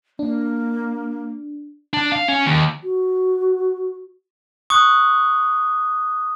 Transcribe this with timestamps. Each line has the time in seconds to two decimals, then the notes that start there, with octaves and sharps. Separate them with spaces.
0.19 A#3 D4
1.93 D4
2.12 F5
2.28 C#4
2.46 D#2
2.84 F#4
4.70 C#6 D#6 F#6